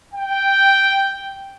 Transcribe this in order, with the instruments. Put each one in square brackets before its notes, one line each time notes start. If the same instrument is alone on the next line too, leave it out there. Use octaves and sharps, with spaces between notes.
[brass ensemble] G5